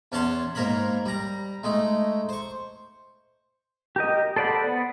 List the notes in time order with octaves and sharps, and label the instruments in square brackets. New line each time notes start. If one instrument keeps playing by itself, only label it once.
[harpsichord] E2 C#4 C#5 F#5 A5 C6
G#2 A#3 A#4 C#5 B5
G3 A#5
G#3 A3 D#4
C5 C#6
[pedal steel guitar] G4 A#4 D#5
A4 C5 D5 F#5 B5
B3